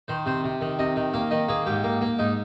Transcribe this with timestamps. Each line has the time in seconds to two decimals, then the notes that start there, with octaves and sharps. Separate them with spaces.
0.08 D#3 C5
0.26 C3 C5
0.44 C3
0.61 D#3
0.79 C3 D#5
0.96 D#3
1.14 A#3 F5
1.31 D#3 D#5
1.49 A#3 G#4
1.66 G#2 G4
1.84 A#3
2.01 A#3
2.19 G#2 D#4